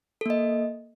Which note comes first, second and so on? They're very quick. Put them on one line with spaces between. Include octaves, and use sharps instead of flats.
A4 A#3 D#5